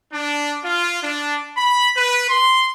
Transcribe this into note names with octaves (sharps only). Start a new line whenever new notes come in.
D4
F4
D4
B5
B4
C6